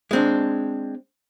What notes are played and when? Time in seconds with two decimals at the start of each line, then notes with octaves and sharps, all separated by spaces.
0.11 G#3 C4 D4